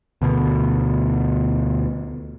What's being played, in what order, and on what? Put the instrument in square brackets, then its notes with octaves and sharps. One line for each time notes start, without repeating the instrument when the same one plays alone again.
[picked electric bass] D2 B2